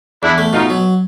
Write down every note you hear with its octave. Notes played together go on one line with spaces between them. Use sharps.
E2 D4 E4
A3
B2 D#4 F4
F#3